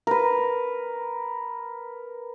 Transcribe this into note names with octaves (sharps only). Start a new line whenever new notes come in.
A#4 B4